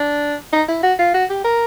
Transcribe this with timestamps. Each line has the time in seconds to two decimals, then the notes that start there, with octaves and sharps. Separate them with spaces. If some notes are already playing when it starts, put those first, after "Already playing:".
Already playing: D4
0.52 D#4
0.68 E4
0.83 F#4
0.98 F4
1.14 F#4
1.30 G4
1.44 A#4